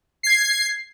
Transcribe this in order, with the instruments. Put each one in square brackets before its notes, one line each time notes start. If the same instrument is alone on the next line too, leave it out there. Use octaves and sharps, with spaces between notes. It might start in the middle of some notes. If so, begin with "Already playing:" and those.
[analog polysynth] G#6 C7